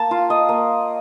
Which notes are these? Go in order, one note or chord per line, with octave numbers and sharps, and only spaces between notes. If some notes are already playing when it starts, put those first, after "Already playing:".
Already playing: A#3 A5
F4
D#5
A#3